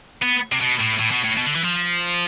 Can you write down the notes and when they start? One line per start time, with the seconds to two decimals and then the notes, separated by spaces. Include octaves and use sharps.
0.22 B3
0.52 C3
0.60 B2
0.80 A2
0.99 A2
1.10 B2
1.23 A2
1.37 B2
1.46 D3
1.55 E3
1.64 F3